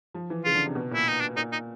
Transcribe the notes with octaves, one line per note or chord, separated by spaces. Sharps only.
F3
E3
C#3 F4
D3
C3
B2
A#2 E4
D#4
D4
A#2 D#4
D#4